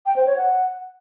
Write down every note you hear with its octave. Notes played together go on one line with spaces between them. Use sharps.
G5
C5
C#5
F#5